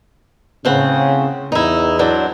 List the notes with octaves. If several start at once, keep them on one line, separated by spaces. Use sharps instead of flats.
A2 C#3 C4 F#5
E2 D#4 E4
F#3 D4 C5